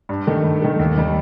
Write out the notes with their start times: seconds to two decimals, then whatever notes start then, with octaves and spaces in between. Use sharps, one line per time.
0.09 G2
0.27 D#3 A3
0.44 G2
0.62 D#3 A3
0.79 D#2
0.97 D#3 G3